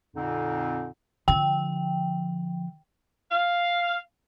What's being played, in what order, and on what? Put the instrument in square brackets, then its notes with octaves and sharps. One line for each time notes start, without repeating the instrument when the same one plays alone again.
[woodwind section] F2 A#2 D3 C4 D#4
[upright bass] D3 F3 [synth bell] G5
[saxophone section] F5